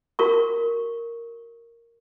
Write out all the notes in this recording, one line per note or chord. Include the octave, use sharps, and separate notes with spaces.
F#4 A#4 C#6